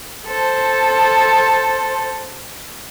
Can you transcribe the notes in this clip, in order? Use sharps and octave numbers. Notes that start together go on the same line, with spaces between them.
A4 C5